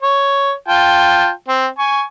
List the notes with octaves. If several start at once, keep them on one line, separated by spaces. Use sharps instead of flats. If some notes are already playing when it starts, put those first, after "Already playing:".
C#5
F4 G5 A5
C4
G#5 C#6